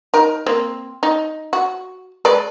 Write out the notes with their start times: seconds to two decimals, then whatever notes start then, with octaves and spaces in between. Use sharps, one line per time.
0.14 D#4 A#4
0.46 A#3 C4
1.03 D#4
1.53 F#4
2.25 G#3 B4 D5